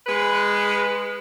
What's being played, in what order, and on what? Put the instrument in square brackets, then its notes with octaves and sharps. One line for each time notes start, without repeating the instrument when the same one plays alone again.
[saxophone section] G#3 B4